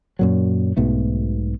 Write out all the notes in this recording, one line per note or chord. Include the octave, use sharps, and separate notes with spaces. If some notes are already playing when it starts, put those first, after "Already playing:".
F#2 A#2 F#3
B1 G#2 B2 A3